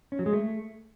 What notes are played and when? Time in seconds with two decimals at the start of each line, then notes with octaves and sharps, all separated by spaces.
0.12 C#4
0.19 F#3
0.26 G#3
0.33 A3